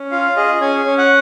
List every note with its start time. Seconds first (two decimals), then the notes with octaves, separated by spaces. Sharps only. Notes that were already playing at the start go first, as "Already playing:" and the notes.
Already playing: C#4
0.11 F4 F5
0.37 G#4 D#5
0.61 C#4 G#5
0.86 C#4
0.98 F#5